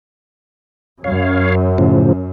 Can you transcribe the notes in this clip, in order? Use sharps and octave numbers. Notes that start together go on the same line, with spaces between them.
F#2 C#5 F5
A2 C#3 F3